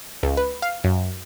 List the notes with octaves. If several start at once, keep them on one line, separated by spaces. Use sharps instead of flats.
C#2
B4
F5
F#2